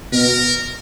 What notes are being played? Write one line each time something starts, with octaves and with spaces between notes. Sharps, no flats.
B2 A#4